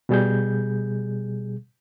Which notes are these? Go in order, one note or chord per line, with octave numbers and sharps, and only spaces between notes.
B2 G3 G#4 G6